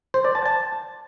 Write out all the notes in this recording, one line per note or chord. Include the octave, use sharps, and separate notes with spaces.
C5
D5
A5
A5